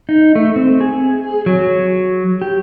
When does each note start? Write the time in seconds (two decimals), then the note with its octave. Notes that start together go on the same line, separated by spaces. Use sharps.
0.09 D#4
0.35 A3
0.56 C4
0.81 G#4
1.46 F#3
2.42 G4